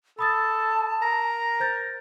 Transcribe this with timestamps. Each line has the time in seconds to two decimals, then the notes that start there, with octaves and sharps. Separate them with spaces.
0.19 A4 A5 B5 D#6 A6
1.02 A#4 A#5
1.60 C5 G6 A6